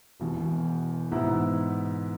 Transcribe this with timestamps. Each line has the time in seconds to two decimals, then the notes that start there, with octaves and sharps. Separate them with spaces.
0.20 E1 E2 B2
1.11 G#2 E3 B3 E4